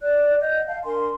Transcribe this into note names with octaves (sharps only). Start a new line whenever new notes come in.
D5 F#6
D#5 F#5 G6
F5 A5
D4 A#4 G#5 C6